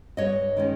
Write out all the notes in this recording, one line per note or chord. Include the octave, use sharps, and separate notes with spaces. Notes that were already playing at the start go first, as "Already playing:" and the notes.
G2 C#5 D#5
D#3 G#3 C#4